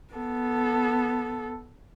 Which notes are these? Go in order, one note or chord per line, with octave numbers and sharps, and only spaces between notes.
B3 A4